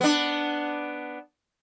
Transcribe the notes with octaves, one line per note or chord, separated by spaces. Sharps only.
B3 D4